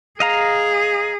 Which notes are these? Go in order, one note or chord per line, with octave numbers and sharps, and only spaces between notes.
G#4 D#5 F5 A#5